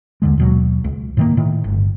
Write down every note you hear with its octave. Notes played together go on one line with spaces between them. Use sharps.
D#2 D3 G#3
D#2 B2 F#3
C#2
A2 D#3 A#3
A2 D#3
G1